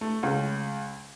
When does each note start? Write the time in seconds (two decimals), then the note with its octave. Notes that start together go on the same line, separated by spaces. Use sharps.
0.01 A3
0.23 C#2